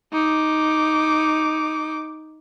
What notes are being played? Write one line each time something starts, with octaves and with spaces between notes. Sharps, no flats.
D#4 D6